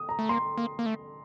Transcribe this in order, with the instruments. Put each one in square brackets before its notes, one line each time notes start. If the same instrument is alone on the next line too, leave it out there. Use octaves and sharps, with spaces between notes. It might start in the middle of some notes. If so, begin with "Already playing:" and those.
Already playing: [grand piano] D#6
A#5
[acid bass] A3
[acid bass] A#3 [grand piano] C6
[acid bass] A#3
A#3
A3